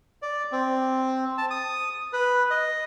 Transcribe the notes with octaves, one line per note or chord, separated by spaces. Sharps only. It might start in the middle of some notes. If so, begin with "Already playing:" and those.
D5
C4
A5
D#6
B4
D#5